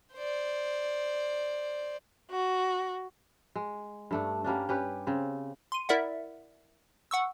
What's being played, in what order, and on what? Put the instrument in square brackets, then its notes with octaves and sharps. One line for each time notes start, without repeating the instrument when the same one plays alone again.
[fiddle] C5 D5
[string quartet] F#4
[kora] G#3
G2 A3 D4
G3 A#3 C#4 D4
C#4 G4 B4
C#3 C4
[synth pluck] C6 D#7
E4 A#4 D5 E5 F#5
F#5 C#6 E6